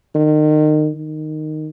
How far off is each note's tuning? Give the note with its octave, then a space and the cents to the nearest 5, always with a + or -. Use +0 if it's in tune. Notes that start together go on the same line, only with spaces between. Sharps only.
D#3 -30
D#3 -10